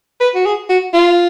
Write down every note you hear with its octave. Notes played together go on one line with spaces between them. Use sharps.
B4
F#4
G#4
F#4
F4